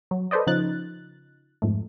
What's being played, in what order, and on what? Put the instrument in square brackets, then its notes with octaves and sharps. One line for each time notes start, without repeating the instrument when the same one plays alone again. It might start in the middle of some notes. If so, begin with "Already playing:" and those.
[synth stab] F#3
A4 B4 C5 D5 D#5
C#3 F3 D#4 F#6 A6
F2 G#2 A3